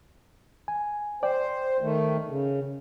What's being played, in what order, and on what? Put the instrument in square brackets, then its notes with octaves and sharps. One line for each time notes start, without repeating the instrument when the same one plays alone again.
[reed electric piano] G#5
[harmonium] C5 [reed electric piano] D5 G5
[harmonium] D#3 A3
C#3